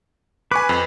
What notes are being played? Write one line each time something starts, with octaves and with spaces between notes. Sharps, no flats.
B4 G#5 C#6 D6
F2